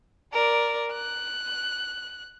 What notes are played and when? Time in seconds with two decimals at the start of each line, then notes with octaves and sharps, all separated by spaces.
0.33 A#4 D5
0.92 F#6